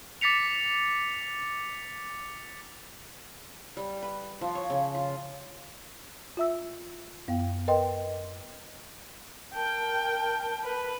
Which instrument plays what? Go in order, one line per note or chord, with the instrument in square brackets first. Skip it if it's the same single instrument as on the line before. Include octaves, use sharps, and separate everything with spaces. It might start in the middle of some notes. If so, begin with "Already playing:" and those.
[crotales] D6 A6 B6 C#7 F7
[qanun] G3
B4
F3
C#5
C#3
F4
[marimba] F4 E5 E6
F#2 B3 F5 G5
A#4 B4 D#5 G5 C6
[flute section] A#4 A5 [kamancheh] G5
[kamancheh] B4